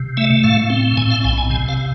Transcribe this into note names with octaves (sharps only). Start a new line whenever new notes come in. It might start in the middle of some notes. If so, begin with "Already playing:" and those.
Already playing: C3
A3 E5
A2 F5
C4
A2 G#5
F5
B1 G#5
G#5
C3 G#5
F5